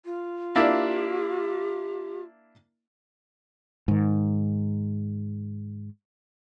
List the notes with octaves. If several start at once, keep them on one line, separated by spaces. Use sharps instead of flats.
F4
A#3 D4 E4 G4
G#2 D#3